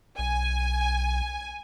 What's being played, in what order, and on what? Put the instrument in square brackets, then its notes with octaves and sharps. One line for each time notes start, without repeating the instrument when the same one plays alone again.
[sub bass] B1 [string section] G#5